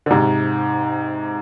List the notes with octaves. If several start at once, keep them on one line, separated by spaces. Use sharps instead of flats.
D3
G#2 C3